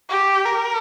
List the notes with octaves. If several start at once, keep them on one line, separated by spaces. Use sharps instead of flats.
G4
A#4